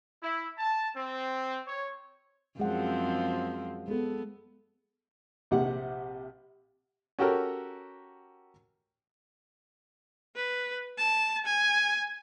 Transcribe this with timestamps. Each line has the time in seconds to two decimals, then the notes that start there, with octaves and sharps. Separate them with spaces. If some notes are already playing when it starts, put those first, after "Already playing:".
0.22 E4
0.57 A5
0.95 C4
1.65 C#5
2.60 F#2 F3 G#3 C4 F#5
3.88 G#3 B3 A4
5.51 A#1 C3 G4 F#5
7.19 C#4 F#4 G4 A4 A#4
10.35 B4
10.98 A5
11.45 G#5